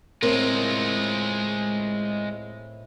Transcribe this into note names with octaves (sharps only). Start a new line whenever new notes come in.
A2 G#3 C4 F4 A#4